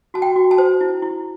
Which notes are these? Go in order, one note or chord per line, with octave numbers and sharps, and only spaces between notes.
F#4 A5
G5
F#4
A5
C5
E4
E4